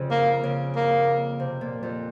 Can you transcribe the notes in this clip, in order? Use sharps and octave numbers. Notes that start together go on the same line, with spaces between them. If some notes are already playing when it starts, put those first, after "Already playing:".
Already playing: F2 C#3
A#3
C#3
A#3
C3
A#2
F2